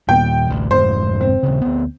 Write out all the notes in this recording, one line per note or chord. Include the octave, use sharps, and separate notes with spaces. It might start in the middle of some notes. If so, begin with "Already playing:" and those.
D#2 A#2 G5
A1 D2
F1 G#2 C5
C4
D#1 C#3
D2 B3